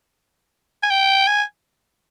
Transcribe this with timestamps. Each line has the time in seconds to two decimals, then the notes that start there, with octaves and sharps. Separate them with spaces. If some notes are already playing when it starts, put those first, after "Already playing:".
0.83 G#5
0.90 G5
1.27 G#5